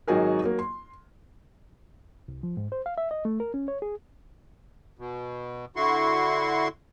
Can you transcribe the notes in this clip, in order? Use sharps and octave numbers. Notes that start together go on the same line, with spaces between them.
G#1 F#3 D#4 F#4 G#4 A#4
F#3 A#3
C6
C2
F3
G#2
C5
F5
E5
D#5
A3
A#4
C#4
C#5
G#4
B2
D3 E4 F#4 C6 C#6